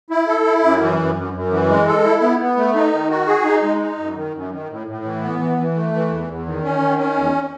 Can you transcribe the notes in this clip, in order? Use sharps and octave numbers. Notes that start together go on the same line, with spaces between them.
E4
A4
E4
F#2
E3
F#2
F#2
F#2
E3
G#3
A4
E4
B3
B3
A3
D#4
D#3
F#4
G#4
D#4
G#3
D#4
F#2
D#3
F#2
D#3
A2
A2
E3
B3
E3
E3
A3
E3
E2
E2
D#3
C#4
D#3
C#4
E2